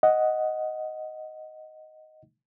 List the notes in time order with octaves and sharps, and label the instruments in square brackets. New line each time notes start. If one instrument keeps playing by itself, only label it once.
[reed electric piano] D#5 F#5